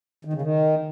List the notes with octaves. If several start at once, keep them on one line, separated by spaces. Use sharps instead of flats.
D#3
C#3
D#3